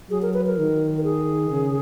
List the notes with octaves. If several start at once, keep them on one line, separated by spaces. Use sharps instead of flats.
F#3 G#4
A#4
B4
A#4
D#3
A#4
G#4
C#3